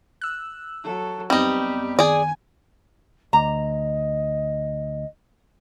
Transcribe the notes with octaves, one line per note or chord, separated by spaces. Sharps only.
E6 F#6
F#3 A4
F#2 G3 B3 C4 D#4 G4
D#3 G#4 D5 G#5
D2 D#5 A#5